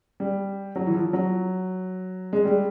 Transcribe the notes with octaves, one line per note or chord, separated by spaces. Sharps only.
G3
F#3
E3
F3
F#3
G#3
G3